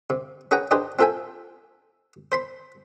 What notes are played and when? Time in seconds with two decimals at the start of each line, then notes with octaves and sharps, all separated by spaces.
0.10 C3
0.51 C#4 G#4 B4 F#5 G5 A#5
0.71 D4 D#4 G4 G#4 B4 C5
0.99 C4 F4 A4 E5 G5 G#5
2.32 C5 B5 C6